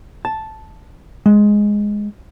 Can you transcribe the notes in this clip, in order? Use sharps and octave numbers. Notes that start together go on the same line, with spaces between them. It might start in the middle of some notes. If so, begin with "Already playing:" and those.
A5
G#3